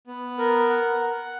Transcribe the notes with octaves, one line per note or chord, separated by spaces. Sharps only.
B3
A#4
F#5
F#5